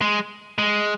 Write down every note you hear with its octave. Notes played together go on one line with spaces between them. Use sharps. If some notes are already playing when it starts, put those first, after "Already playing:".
G#3
G#3